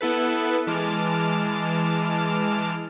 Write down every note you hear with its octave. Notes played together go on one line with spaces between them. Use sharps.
B3 E4 A4 B4
E3 G#3 A5 D6 F6